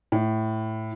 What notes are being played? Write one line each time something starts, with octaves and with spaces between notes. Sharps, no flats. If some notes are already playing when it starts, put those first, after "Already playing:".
A2